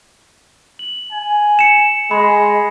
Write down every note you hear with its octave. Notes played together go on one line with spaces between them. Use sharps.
F#7
G#5
C#7 E7
G#3 B5